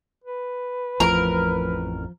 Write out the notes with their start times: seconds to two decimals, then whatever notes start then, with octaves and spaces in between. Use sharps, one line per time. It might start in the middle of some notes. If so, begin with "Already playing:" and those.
0.24 B4
1.00 A1 F2 A2 F3 A#4